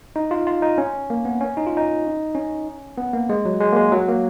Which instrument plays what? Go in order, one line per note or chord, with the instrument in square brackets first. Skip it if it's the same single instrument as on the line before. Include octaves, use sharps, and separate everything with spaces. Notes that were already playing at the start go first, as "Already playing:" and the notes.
[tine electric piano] D#4
F4
F4
D#4
C#4
A#3
B3
C#4
D#4
F4
D#4
C#4
B3
A#3
G#3
F#3
G#3
A#3
G#3
F#3
A#3